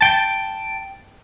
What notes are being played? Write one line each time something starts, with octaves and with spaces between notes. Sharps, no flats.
G5 A5